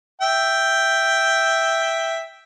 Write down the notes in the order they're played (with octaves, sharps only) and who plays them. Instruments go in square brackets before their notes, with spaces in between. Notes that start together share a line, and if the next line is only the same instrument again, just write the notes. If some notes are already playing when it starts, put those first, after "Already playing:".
[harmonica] E5 G5